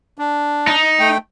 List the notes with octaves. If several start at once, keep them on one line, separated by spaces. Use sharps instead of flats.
D4
D#4
A3 G5